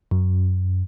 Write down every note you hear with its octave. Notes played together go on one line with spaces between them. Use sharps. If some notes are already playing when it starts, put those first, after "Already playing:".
F#2